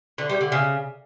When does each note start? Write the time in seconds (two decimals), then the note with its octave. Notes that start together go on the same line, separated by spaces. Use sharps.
0.18 D3
0.29 G3
0.41 D3
0.52 C#3